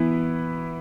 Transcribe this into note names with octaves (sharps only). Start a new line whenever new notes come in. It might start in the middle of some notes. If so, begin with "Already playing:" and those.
Already playing: E3 B3 E4